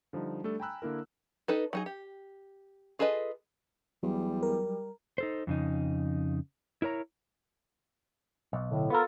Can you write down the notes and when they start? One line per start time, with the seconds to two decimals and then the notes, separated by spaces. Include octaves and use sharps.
0.13 D3 F3 G3 D#4
0.44 G3 A3 D4 A4
0.60 G5 G#5 A#5 B5 E6 F#6
0.82 D3 A#3 E4 A#4
1.48 D#4 A4 B4
1.73 F#3 D#4 G#4
1.86 G4
2.99 F4 G#4 A4 B4 D#5
4.03 E2 F#3 G3
4.43 A#4
5.18 D#4 A4 C5
5.47 F2 C#3 D#4
6.82 E4 A#4 C#5 A#5
8.53 B1
8.69 A2 D3
8.90 B3 F4 A4 A#4